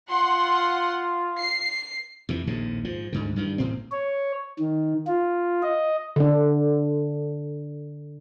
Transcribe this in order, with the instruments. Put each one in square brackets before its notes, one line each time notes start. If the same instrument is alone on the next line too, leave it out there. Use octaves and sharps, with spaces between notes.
[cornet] F4 [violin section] F#5 C6
[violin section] C7
[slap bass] F2 C3 E3
A#1 D#2 A2 C3
G#2 F3
D2 G#2 D3
G2 D#3 E3
A1 A2 C4
[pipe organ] C#5
D#3
F4
D#5
[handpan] D3 D4